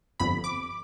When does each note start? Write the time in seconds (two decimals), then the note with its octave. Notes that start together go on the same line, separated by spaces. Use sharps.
0.20 G1 F2 B5
0.44 D6